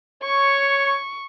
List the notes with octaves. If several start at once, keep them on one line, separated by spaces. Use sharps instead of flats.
C#5 C#6